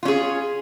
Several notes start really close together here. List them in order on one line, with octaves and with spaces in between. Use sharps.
F4 C#4 G#4